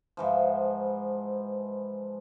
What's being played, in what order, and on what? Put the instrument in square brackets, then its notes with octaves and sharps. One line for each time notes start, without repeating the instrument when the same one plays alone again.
[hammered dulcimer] G#2 E3 F3